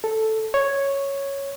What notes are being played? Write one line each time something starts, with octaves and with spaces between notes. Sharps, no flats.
A4
C#5